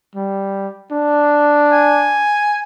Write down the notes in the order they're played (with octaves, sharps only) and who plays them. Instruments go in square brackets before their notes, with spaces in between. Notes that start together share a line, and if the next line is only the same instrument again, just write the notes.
[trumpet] G3
D4
[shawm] G#5